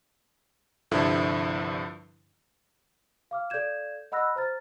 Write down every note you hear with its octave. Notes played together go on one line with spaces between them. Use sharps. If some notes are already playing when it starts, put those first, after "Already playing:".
C2 G2 D3 F3 E4 A4
F5 D6 F6
A4 D5 F5 G6 G#6 E7
D#5 F#5 B5 E6 F#6 A#6
C5 A#5 F6 A6